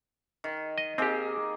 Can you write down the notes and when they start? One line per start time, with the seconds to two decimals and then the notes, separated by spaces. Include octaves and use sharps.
0.44 D#3
0.78 D#5
0.98 A#3 C4 D#4 G4 G#4